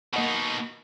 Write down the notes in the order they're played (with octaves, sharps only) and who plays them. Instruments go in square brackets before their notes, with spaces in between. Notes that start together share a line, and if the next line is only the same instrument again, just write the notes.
[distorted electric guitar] B2 D#4 [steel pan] A#3 D#5 F#5